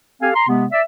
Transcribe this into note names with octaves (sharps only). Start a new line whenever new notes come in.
C4 G4 A4 F5 G#5
A#5 C6
C3 G#3 B3
D5 E5